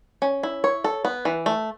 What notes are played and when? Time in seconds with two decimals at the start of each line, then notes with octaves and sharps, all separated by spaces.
0.22 C#4
0.43 E4
0.64 C#5
0.84 A4
1.05 B3
1.25 E3
1.46 A3